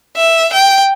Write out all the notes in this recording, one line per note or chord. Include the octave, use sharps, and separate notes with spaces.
E5
G5